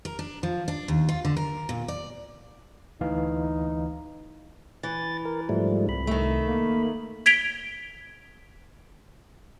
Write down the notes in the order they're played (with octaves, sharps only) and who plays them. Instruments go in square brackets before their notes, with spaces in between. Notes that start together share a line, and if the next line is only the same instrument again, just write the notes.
[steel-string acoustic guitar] A#4
D4
F3
D4
D#2
F4
D3
A#4
A#2
D5
[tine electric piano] D2 E3 F5 [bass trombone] D#4
[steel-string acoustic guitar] E3 [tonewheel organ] A6
[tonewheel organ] A#4
[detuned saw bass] G#2 [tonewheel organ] F3 G3 A3
[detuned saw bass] C2 [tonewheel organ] B5
[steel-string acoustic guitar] D#3 A3
[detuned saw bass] A#3
[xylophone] G#6 B6 D7 F7 G7